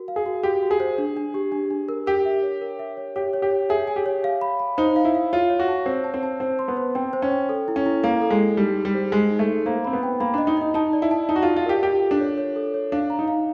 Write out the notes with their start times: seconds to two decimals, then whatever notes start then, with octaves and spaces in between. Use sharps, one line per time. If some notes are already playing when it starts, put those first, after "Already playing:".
Already playing: F#4 A#4
0.08 F5
0.16 G#4
0.26 F#4
0.43 F#4 G4
0.63 F#4
0.71 G#4
0.80 C5
0.98 D4
1.17 D4
1.34 G4
1.52 D4
1.70 D4
1.89 A#4
2.07 G4 A#4
2.25 E5
2.43 C#5
2.61 A#4
2.79 E5
2.97 C#5
3.16 G4 C#5
3.33 C#5
3.42 G4
3.51 C#5
3.69 G#4 E5
3.87 G#5
3.96 G4
4.06 C#5
4.24 F5
4.41 B5
4.59 B5
4.78 D#4 C5
4.96 F5
5.05 E4
5.15 F5
5.32 F4 C#5
5.50 C#5
5.60 F#4
5.68 A5
5.86 C4 C#5
6.04 A5
6.14 C4
6.23 A5
6.40 C4 C5
6.59 C6
6.68 B3
6.77 C5
6.95 C4 G5
7.13 C5
7.22 C#4
7.32 G5
7.49 A4
7.68 E4
7.76 C#4
7.86 E4
8.03 A#3 E4
8.22 A4
8.30 G#3
8.40 A4
8.57 G3 D#4
8.76 G#4
8.85 G3
8.94 C5
9.12 G#3 G#4
9.30 D#4
9.39 A3
9.49 D#4
9.66 A#3 C5
9.85 C4 B5
9.93 B3
10.03 G5
10.20 A#3 B5
10.34 D4 D#5
10.47 D#4
10.57 D#4 D#5
10.74 D#4 A5
10.93 D5
11.02 E4
11.11 A5
11.29 D#4 A5
11.36 F#4
11.43 F4
11.47 F5
11.56 F4
11.66 G4 A#4
11.83 F4 G4
12.02 A4
12.11 D4
12.20 C#5
12.38 C#5
12.56 A4
12.74 C#5
12.92 D4 F5
13.10 A#5
13.19 D#4
13.28 F5